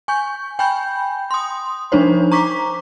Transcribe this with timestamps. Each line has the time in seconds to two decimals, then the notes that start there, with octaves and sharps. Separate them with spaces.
0.08 G#5 C#6 G6
0.59 G5 G#5 B5 G6
1.31 C6 D#6
1.92 F3 D4 D#4 C5 C#5
2.32 A#5 C#6 D6 B6